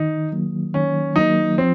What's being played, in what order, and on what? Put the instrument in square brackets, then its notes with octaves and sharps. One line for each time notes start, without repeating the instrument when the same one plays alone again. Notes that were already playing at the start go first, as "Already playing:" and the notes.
Already playing: [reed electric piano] D#3 [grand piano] D#4
[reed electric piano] F#3 A#3
[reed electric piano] D#3 [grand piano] C#4
[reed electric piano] F#3 A#3 [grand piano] D#4
[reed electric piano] F3 [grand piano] C4